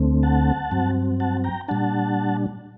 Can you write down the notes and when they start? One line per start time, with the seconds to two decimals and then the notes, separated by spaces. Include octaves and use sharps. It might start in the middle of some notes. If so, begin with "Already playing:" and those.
Already playing: D2 D3 A3 C4
0.23 F#5 A5
0.71 G2 F#3 C4
1.20 F#5 A5
1.44 G5 A#5
1.68 A#2 G3 D4 F#5 A5